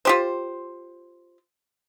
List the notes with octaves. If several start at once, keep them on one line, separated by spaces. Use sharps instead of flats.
F4 G4 C5